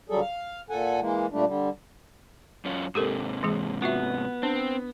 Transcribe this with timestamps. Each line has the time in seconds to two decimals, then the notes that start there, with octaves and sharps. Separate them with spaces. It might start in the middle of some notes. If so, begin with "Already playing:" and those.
0.10 D2 F#3 G3 G#4 A4
0.21 F5
0.70 A#2 A4 F#5 G#5
1.00 E3 G#3 A#3
1.32 A#2 G3 A3 D4
1.46 D3 G3
2.65 F#2 C#4 F4
2.95 G#2 C3 G4 A4 A#4
3.43 E3 G#3 G#4
3.82 B3 F4 F#4 E5
4.43 C4 D4